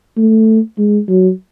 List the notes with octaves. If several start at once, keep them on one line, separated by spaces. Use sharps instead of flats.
A3
G#3
F#3